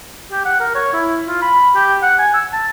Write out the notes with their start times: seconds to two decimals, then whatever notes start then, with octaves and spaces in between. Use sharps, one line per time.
0.32 G4
0.46 F#5
0.60 A#4
0.75 C#5
0.93 E4
1.28 F4
1.42 B5
1.76 G4
2.03 F#5
2.19 G#5
2.34 E6
2.53 A5